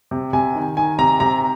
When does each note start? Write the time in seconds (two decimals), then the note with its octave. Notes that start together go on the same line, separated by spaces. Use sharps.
0.11 C3
0.33 C3 G#5
0.55 D#3
0.77 D#3 G#5
0.99 C3 A#5
1.20 C3 A#5